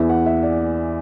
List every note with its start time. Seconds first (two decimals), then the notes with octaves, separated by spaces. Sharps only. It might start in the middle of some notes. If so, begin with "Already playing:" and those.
Already playing: E2 E3 E5
0.09 F#5
0.26 E5
0.43 D5